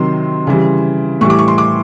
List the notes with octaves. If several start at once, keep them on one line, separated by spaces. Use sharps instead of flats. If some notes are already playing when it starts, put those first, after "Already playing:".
Already playing: C3 D#3 F#3 C6
C#3 E3 G3
A2 E3 G3 C#6
D6
C#6
C6
D6